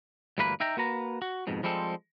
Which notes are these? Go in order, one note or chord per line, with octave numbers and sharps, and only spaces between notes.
D2 G2 E3 A#3 B4 B5
D#4 E5 G5 A#5
A#3 F#4 B4 A#5
F#4
F2 G#2 B2
F3 G3 G#3 C4 A4